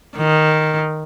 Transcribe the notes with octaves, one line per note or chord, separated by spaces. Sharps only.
D#3